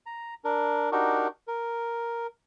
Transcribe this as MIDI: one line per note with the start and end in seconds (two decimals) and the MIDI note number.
0.06 0.34 82
0.45 0.90 62
0.45 0.90 70
0.92 1.27 62
0.92 1.27 63
0.92 1.27 66
0.92 1.27 67
0.92 1.27 70
1.47 2.27 70